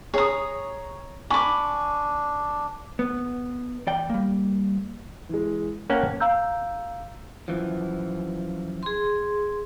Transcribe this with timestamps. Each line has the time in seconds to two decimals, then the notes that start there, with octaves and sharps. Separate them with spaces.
0.14 G#4 C#5 A#5 D#6
1.30 D4 G#5 B5 C#6 D6
2.99 B3
3.87 E2 D5 G5
4.10 G3 A#3
5.29 E3 G#3
5.90 A#3 C#4 F#5 G5 A5 A#5
6.20 F5 A#5 E6 G6
7.48 F#2 E3 F3
8.83 G#4 C6